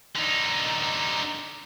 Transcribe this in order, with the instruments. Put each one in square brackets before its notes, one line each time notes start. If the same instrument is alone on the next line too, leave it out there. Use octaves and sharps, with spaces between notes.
[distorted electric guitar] D3 D#4